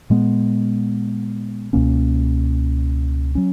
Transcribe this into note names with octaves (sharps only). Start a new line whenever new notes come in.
A#2 G#3 B3
C#2 B2 A#3 C#4
F#3 C#4